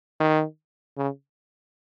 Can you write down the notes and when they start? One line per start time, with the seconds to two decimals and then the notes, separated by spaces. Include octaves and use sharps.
0.20 D#3
0.97 C#3